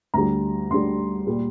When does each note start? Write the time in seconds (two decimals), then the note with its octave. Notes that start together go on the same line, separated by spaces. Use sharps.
0.14 D2 D3 G3 A#5
0.70 D2 D3 G3 C6
1.27 A#2 G3